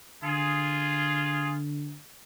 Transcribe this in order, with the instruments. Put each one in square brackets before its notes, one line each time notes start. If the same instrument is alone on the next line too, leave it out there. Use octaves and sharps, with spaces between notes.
[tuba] D3 [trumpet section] F4 G#4